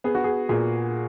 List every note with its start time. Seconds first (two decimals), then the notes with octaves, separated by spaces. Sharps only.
0.04 B3 G#4
0.15 F#4
0.24 G#4
0.49 A#2 G#4